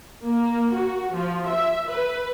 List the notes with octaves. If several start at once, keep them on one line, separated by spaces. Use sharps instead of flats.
A#3
F#4
F3
E5
B4